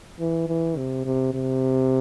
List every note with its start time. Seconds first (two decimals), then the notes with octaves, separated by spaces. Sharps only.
0.20 E3
0.48 E3
0.77 C3
1.06 C3
1.34 C3